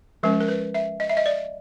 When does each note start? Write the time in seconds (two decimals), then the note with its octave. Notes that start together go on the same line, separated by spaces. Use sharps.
0.23 F3 G#3 C#4 A#4
0.40 A#4
0.48 B4
0.74 E5
1.00 D#5
1.09 E5
1.17 D#5
1.26 D5